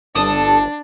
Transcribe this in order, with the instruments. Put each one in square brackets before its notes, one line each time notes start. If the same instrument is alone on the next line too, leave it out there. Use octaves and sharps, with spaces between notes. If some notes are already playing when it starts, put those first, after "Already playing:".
[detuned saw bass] G1 [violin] D4 [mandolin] A4 D#6